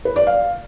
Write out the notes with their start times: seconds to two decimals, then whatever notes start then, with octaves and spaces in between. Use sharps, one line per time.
0.05 B4
0.16 D5
0.27 F5